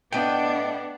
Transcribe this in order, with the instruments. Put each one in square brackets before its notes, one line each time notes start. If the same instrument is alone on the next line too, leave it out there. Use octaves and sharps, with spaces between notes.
[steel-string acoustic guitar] A2 A3 D#5 [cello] B3 D4 [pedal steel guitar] G5